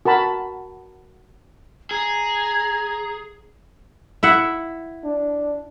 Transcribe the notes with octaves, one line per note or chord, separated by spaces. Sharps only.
F#4 A#4 A5 B5
G#4 A#5
E4 E5 F#5
D4